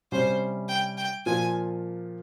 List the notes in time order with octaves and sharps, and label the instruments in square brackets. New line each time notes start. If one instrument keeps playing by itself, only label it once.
[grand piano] C3 G3 C#4 [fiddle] C5
[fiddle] G5
G5
[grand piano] A#2 F3 A#3 F4 [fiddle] G#5